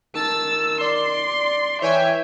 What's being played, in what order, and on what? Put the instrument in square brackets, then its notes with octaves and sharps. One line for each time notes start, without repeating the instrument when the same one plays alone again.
[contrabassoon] D#3 [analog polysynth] A5 A6 [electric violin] E6
[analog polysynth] D5 [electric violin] C6
[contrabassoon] E3 [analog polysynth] C#5 G5 G#5 [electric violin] E5